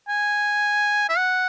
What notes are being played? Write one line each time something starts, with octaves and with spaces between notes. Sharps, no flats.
G#5
E5
F#5